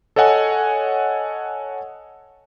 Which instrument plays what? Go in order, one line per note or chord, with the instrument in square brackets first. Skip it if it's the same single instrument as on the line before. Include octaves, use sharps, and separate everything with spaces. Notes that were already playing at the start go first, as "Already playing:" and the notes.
[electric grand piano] A4 C#5 D#5 F#5 G#5